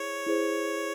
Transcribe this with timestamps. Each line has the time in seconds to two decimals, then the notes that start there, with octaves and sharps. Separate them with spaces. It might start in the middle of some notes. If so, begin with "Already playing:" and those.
Already playing: E4 G#4 C5 C#5
0.27 E4 G#4 C5